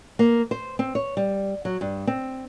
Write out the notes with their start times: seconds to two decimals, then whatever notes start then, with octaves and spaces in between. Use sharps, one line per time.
0.19 A#3
0.51 C5
0.79 C4
0.95 C#5
1.17 G3
1.65 F#3
1.81 G2
2.07 C4